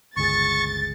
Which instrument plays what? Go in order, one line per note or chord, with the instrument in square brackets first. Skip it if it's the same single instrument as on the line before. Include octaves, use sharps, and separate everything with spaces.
[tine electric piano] G1 C#2 G#4 [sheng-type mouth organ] C#6 [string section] A6